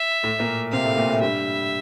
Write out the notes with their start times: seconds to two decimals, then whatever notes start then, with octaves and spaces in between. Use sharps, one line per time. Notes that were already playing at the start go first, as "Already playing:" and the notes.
Already playing: E5
0.23 A2 A3
0.39 A#2 A#3
0.72 C3 C4 F5
0.84 A2 A3
0.97 A#2 A#3
1.09 A2 A3
1.21 G2 G3 E5